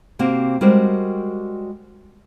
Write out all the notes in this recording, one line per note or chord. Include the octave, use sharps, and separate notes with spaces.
C3 A#3 C4 F#4 G4
G3 G#3 F#4 G4 A#4 C5